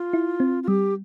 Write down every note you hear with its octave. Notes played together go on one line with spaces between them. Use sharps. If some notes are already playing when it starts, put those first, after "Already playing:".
Already playing: F4
E4
C4
F4
G3 G4